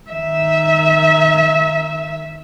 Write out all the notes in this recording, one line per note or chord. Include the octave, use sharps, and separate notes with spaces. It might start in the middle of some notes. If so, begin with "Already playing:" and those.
D#3 E5